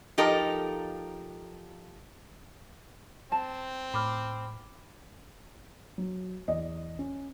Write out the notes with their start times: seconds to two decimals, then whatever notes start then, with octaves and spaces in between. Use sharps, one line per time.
0.18 F3 D#4 G4 A4 A#4
3.32 C4 A5
3.94 A2 B5 D6 F6
5.98 F#3
6.48 E2 D5 D#5
6.99 C#4